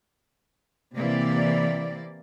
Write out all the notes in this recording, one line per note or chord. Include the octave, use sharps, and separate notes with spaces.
C3 E3 A#3 D5